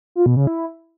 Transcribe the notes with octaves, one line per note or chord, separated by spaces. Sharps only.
F4
B2
C#3
E4